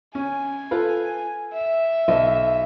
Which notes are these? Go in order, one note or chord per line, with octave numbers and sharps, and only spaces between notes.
C#4 G#5
F4 A4 B4
E5
B1